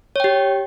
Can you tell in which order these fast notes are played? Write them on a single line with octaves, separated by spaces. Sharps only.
C#5 G5 G4